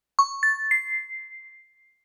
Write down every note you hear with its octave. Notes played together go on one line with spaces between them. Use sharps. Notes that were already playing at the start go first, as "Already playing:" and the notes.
C#6
A6
C7